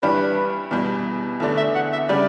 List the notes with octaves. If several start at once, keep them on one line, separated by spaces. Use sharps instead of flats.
G2 E3 G3 D4 B4
E2 B2 G3
E2 D3 A3 D4 A4
E5
F#5
E5
C#3 G3 D4 D5